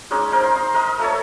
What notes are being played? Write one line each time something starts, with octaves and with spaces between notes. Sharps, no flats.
G#3 C#4 D#4 D5
D#4 A#4 C5
C6
D#4 D#5 C6
A#4 D#5
A3 A4 C#5